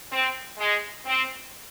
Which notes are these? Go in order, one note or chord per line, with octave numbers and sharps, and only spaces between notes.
C4
G#3
C4